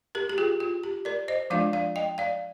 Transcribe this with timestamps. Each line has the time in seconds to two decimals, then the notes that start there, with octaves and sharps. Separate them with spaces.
0.15 G4 A#4
0.30 G4
0.38 F4 G#4
0.60 F4
0.83 G4
1.05 A#4 D5
1.28 C5 D#5
1.50 F3 G#3 D4 F4 D5 F5
1.73 D5 F5
1.96 D#5 G5
2.18 D5 F5